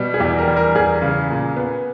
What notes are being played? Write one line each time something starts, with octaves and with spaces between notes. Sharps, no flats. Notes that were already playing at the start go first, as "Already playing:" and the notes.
Already playing: B2 G3
G#4
E2 G4
A#4
G3
A#4
E2 G#4
C#3
A#2
B3